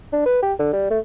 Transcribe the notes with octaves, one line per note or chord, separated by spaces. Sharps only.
D4
B4
G4
D3
G3
A3